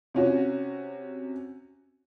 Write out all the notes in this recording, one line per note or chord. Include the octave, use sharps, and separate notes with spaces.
C3 C#4 F#4